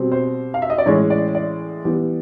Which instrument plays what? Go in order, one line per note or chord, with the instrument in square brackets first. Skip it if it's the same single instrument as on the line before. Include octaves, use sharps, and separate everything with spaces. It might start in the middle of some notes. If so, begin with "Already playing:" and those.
Already playing: [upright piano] B2 G3 C4
C5
F5
E5
D#5
D5
A2 E3 G#3 C#4 C#5
D5
D5
E3 G3 B3